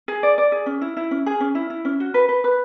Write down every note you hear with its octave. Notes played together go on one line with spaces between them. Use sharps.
G#4
D5
D5
G#4
C#4
E4
E4
C#4
G#4
C#4
E4
E4
C#4
F#4
B4
B4
B4